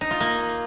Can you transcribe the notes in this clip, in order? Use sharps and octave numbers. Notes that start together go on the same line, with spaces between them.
D#4
F4
A#3